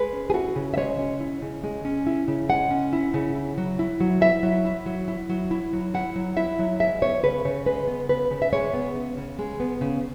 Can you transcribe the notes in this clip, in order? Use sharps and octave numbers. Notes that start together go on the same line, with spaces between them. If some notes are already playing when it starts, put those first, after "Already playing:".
Already playing: G#3 B4
C#4
G#4
E4 F#4
C#3
E5
G#3 C#5
C#4
E4
C#3
G#3
C#4
E4
C#3
G#3 F#5
C#4
E4
C#3
E4
F#3
E4
F#3
E4 E5
F#3
E4
F#3
E4
F#3
E4
F#3
E4 F#5
F#3
E4 E5
F#3
G#3 E5
B3 C#5
C#3 B4
C#3 C#5
G#3 B4
B3
C#3 B4
C#3
E5
G#3 C#5
B3
C#3
C#3
G#3
B3
C#3